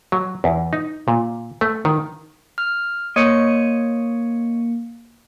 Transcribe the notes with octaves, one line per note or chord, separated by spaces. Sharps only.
F#3
E2
D#4
A#2
A3
D#3
F6
A#3 C#5 D#5 C#7